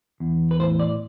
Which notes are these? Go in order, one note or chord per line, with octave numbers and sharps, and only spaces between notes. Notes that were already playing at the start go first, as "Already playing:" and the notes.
E2
B4
A2 C5
D5